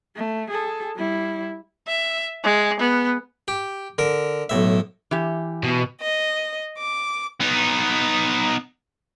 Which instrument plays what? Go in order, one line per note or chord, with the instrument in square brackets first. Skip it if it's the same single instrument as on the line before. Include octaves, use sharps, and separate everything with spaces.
[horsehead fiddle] A3
G#4 A4
G3 E4
[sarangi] E5
G#3
B3
[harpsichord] G4
D3 A#4
B1 A2 E5
[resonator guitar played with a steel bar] E3 G4
[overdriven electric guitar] B2
[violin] D#5
D6
[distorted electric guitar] B3 D#4